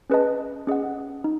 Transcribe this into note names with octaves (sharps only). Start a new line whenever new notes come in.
C#4 G#4 B4 D#5 A5
C#4 G#4 D#5 F#5
D#4